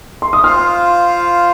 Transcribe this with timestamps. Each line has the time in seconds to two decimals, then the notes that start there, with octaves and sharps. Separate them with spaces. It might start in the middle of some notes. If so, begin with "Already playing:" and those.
0.22 C6
0.33 D#6
0.44 F4 C5 F5 C6 F6